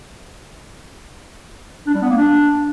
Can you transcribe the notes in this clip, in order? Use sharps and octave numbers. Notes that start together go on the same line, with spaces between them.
D4
G3
B3
A#3
D4